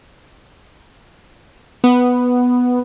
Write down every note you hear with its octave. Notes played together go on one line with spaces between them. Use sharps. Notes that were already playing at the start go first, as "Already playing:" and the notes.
B3